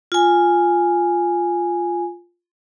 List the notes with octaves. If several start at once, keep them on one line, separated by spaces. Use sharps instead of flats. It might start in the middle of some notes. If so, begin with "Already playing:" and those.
F4 G#5